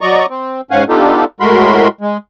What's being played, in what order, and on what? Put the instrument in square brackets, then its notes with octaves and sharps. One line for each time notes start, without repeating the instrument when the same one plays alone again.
[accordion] F#3 D5 D#5 A#5 C#6
C4
G#2 C#4 F5 F#5 G#5
B3 D4 D#4 F4 G4 A4
A2 G#3 F#4 A#4 B5 C6
G#3